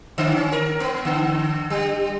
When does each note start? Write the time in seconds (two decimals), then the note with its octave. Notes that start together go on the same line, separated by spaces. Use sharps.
0.18 D3
0.36 C#4
0.52 A#4
0.80 B3
1.05 D3
1.70 G3